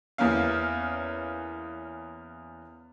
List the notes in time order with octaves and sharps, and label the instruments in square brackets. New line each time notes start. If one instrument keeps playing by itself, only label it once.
[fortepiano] E2 A#3 C#4 F5